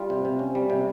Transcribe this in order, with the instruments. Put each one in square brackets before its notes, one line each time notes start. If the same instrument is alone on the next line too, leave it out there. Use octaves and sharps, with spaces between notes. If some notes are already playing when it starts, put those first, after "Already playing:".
Already playing: [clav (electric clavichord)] G3 F4
C3
C3
C#4
G3
C3